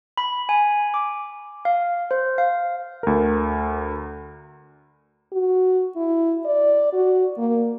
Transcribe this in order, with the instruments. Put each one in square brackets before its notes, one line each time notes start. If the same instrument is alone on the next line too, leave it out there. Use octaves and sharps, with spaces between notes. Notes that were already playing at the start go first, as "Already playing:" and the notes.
[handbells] B5
G#5
D6
F5
C5
F5
[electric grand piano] D2 A#4
[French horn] F#4
E4
D5
F#4
A#3